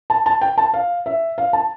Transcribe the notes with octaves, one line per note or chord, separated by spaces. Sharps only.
A5
A5
G5
A5
F5
E5
F5
A5